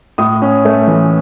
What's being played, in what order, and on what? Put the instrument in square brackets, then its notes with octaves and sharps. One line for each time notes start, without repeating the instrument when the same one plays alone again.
[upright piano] A2 D#6
C#4
A3
E3